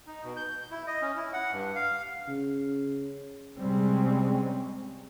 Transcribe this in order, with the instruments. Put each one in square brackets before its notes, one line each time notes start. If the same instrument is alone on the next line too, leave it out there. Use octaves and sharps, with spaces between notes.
[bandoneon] D#4
B2
G6
E4
D#5
C#4
E4
F#5
G2
F5
[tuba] C#3
[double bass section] C3 G3 G#3 C4 C#4